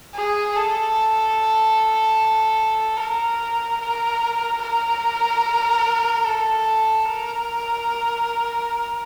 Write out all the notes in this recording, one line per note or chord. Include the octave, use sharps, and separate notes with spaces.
G#4
A4
A#4
A#4
A#4
A4
A#4